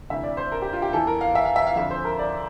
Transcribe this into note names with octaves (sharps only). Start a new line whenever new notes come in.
D2 C3 E3 E5
D5
C5
A#4
G4
F4
G4
E2 E3 A4
A#4
F5
E5
F5
E5
F5
F2 D3 E5
C5
A#4
D5